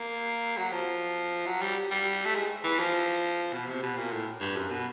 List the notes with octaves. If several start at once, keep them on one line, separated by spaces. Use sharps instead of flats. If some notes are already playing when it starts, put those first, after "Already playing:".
Already playing: A#3
F#3
F3
F#3
G3
G3
A3
G#3
E3
F3
B2
C3
B2
A#2
A2
G2
F#2
B2